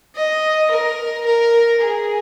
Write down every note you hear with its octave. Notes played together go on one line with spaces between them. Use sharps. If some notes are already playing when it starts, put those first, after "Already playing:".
D#5
A#4
A#4
G#4